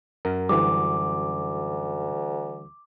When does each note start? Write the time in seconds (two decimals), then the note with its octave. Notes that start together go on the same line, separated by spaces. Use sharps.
0.25 F#2 A#4
0.49 D2 D3 E3 G3 D6